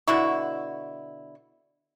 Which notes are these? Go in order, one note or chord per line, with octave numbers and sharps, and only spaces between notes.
B2 D3 E4 C#6